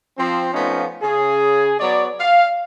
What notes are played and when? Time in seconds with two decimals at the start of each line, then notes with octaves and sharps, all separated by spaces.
0.18 F3 C4
0.53 F3 A3 B3 C#4 D#4 F4
1.02 C#3 G#4
1.80 F#3 B3 C#5 D5
2.19 F5